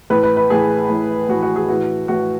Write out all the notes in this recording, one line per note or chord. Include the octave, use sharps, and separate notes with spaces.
A2 E3 B4
B4
B4
A2 E3 G#4
A2 E3
A2 E3 F#4
F#4
G#4
A2 E3 F#4
A2 E3 F#4